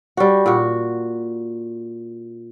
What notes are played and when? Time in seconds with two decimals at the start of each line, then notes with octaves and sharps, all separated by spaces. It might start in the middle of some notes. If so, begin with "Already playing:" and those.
0.17 G3 F#4
0.46 A#2 F#4